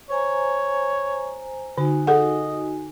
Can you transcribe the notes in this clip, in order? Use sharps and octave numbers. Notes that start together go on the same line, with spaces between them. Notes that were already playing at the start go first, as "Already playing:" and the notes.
C5 C#5 G#5 A#5
D3 D#4 F#4 G#5
G#4 A4 D#5 F#5